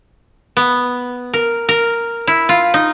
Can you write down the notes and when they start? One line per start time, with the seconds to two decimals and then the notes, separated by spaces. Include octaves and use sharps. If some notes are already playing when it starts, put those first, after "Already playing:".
0.57 B3
1.33 A#4
1.69 A#4
2.27 E4
2.49 F4
2.74 D#4